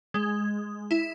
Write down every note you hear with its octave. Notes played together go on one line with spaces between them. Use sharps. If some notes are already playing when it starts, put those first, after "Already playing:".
G#3
E4